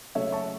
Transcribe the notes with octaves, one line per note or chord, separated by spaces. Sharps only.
C#3 F#3 A3 C#5 E5
A5 C#6